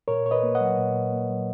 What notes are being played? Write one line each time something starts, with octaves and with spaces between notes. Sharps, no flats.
A#2 A#4 C#5
A#2 C#5
B4 D#5
A#3
D#5 F#5
F#3
A#2
A#2
A#3
F#3